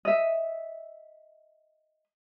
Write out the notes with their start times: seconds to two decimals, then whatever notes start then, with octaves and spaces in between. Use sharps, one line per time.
0.05 D#5 E5